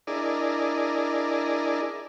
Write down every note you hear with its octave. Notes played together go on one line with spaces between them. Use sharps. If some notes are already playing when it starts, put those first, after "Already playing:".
D4 E4 G#4 A#4 D5 D#5